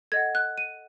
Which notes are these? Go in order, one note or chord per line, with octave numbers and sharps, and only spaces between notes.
A4 D#5 F#5 G#6
F#6
D#7